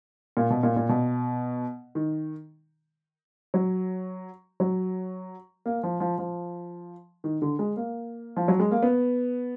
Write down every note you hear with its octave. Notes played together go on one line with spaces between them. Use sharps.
A#2
B2
A#2
A#2
B2
D#3
F#3
F#3
A#3
F3
F3
F3
D#3
D3
G#3
A#3
F3
F#3
G#3
A#3
B3